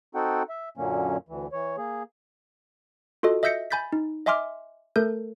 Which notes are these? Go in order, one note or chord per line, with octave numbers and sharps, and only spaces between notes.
C4 D#4 F#4 A4 F#5 G5
E5
F#2 A#2 D3 F#3 A#3 C#4
D2 E3
E3 C#5
A#3 G#4
F4 F#4 A4 D#5
D#5 E5 E6 G6 A#6 C#7
G#5 B5 G6 A6 B6
D#4
D#5 E5 G#5 C6 D6 F6
A3 A4 A#4 G6